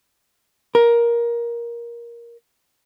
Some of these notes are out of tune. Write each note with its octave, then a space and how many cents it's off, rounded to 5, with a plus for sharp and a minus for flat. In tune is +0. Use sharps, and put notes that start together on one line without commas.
A#4 +15